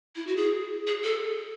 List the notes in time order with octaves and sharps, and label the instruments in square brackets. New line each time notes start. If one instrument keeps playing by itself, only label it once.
[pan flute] E4
F#4
G#4
G#4
A4